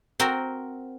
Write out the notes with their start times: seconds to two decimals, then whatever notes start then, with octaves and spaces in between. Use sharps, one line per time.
0.20 C4 F#4 A#4